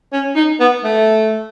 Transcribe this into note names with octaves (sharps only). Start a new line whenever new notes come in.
C#4
D#4
B3
A3